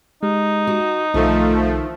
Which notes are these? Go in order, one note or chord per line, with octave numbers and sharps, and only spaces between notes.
G#3 D#4 G4
F#4
B1 D#3 F3 A3